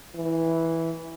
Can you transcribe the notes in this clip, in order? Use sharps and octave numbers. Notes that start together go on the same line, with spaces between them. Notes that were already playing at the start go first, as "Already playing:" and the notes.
E3